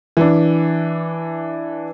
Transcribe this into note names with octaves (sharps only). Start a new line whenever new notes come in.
E3 D4